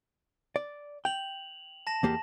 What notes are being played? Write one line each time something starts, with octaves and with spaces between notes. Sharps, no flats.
D5
G5 F7 F#7
A5 A#6 E7
E2 A#3 G4